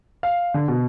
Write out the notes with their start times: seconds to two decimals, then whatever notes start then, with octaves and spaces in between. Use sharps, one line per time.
0.23 F5
0.54 D3
0.68 B2